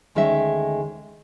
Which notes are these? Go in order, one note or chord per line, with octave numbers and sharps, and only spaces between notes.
D2 D#3 G#3 C#4 D#4 E5